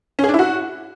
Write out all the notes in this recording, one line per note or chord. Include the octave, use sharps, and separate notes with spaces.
C#4
G#4
D4
E4
F#4